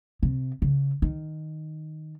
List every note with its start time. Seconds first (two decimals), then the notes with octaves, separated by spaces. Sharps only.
0.23 C3
0.62 C#3
1.02 D#3